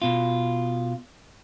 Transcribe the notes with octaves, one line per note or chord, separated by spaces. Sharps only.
B2 F4